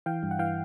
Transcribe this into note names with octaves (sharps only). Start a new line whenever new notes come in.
E3 F5 G5
G2
F#5
E3 F5 G5